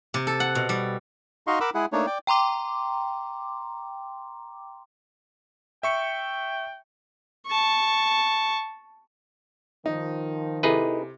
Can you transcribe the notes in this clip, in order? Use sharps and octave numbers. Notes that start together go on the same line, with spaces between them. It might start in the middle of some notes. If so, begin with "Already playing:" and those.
C3
A4
F#5
B2
G3
D#4 F#4 D#5 F5 C6 C#6
A#4 F#5 B5 D6 E6
G#3 E4 G#4 F#5
A3 A#3 D4 D#4 C#5
D5 G5
G5 A#5 C6 D6
E5 G5 C#6 C#7
A5 C#6
D#3 F3 D#4
C3 D#4 E4 G#4 A4 B4 D#5